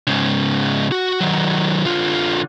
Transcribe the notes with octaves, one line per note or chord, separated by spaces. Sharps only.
G#2 C#3
F#4
D#3 F#3
D3 F4